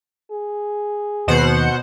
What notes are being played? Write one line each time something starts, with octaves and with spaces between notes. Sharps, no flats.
G#4
D#2 B2 C5 F#5